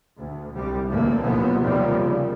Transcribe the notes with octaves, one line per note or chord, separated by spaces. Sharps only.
D2
C2 G3
A1 D2 A3 A#3
D#2 B2 F3 F#3 B3
D#2 C3 D#3 F3 G3 A#3
C#3